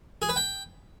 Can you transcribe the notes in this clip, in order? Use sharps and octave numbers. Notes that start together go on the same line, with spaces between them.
G#4
B4
G5